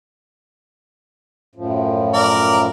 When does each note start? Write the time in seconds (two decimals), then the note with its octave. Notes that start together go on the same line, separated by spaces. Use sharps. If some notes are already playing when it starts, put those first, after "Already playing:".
1.55 F#2 A2 F3
2.13 A#4 D5